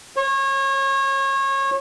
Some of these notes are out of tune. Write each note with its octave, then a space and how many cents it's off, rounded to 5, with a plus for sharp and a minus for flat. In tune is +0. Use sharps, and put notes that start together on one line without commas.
C#5 -30